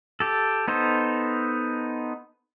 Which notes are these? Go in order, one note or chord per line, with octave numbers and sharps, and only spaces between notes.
G4 A4
B3 D#4 A4 C5